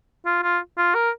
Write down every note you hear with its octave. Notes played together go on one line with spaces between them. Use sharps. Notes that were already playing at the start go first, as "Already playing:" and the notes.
F4
F4
F4
A#4